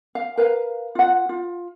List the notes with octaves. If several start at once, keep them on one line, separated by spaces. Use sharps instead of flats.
F5
A#4 B4 F5
F4 F#5
F4